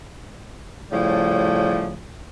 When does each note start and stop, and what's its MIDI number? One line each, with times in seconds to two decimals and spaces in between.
0.92 1.96 45
0.92 1.96 49
0.92 1.96 53
0.92 1.96 55